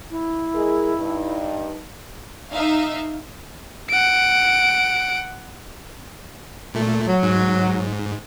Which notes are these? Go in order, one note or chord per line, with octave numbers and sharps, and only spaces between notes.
E4
G#3 G#4 A#4
G2 D#4
D#4 E5 F5
F#5 D7
A#2 A3
F#3
G#2